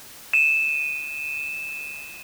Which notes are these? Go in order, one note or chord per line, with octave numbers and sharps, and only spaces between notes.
D#7 E7